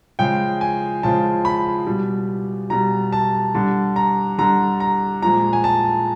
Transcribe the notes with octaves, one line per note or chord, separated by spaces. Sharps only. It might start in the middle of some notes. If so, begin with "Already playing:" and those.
C#3 F3 G#3 G5
G#5
C#3 F3 G#3 A5
B5
B2 G3
B2 G3 A#5
A5
D3 G3 A5
A#5
D3 G3 A#5
A#5
A#2 F3 G#3 A#5
G#5
A5